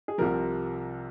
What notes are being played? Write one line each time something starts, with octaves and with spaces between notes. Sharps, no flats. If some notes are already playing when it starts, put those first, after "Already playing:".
G#4
C2 C3 F3 A#4